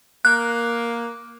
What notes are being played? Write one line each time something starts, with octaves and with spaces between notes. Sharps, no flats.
A#3 F#6